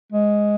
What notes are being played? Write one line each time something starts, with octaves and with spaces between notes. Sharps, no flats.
G#3